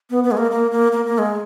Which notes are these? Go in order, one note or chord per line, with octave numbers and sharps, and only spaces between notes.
B3
B3
G#3
A#3
A#3
A#3
A#3
A#3
G#3